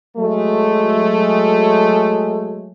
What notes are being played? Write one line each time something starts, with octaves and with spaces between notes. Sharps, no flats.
F#3 G#3 A3